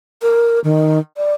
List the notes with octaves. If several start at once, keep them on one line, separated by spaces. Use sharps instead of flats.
A#4
D#3
D5